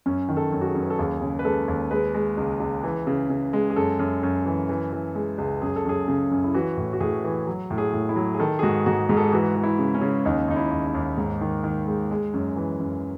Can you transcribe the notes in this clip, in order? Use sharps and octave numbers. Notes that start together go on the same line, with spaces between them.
F#2 C#4
D#3
A4
F#2
F#4
G#4
F#2
B4
A4
D#2 G#4
C#3
B4
G#3 A4
D#2
G#3 B4
G#3
C#2
C#2
E3
C#3
C#3
G#3
G#4
F#2 A4
F#2
F#2
E3
E3
E3
G#3
C#2
F#2 G#4
A4
F#2 G#4
C#3
F#2
E4
E3 F#4
A2
F#4
A2 G#4
E3
F#3
A2
G#4
A2
E4
F#3
G#4
D#3 A4
G#4
G#2 F#4
G#2 F#4
G#2 G#4
A4
G#4
E3 F#4
E3
E4
C#3
C#4
C#3
D#2 D#4
D#2 D#4
E4
D#2
D#4
D#2
G#2
D#3
D#3
G#3
G#3
F#2
E3
F#2